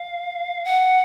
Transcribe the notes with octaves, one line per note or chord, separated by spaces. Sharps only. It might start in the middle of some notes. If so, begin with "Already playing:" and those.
Already playing: F5
F#5